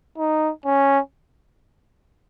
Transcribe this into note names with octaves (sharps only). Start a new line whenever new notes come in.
D#4
C#4